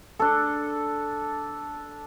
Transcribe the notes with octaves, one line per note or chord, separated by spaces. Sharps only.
D4 A4